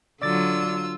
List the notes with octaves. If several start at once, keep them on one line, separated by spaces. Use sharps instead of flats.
D3 F#3 F4 D5 D6 E6 A6